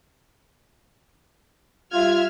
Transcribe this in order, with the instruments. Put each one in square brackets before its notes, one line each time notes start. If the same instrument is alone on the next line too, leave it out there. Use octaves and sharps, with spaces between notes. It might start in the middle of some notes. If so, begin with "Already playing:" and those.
[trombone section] G3 F4 [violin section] E5 F6 G#6